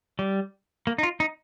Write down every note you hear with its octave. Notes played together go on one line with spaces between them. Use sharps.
G3
A#3
D#4
F4
D#4